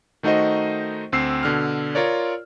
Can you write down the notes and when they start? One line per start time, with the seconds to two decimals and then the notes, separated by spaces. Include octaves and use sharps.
0.23 D#3 A3 D#4 F#4 C5 D#5
1.12 D2 C4 E6 C7
1.43 B2 D3 F6
1.95 F4 A#4 C#5 D5